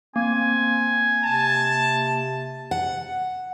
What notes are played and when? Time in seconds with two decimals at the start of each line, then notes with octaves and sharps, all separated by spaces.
0.16 A#3 C4 G#5
1.24 C3 A5
2.71 F#5